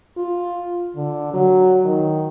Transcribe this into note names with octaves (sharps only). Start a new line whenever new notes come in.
F4
D3
F#3
D#3